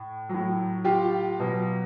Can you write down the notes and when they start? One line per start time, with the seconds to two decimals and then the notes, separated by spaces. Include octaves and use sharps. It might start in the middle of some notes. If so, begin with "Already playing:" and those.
Already playing: A2
0.29 A2 F#3
0.84 F4 G4
1.39 B2 F#3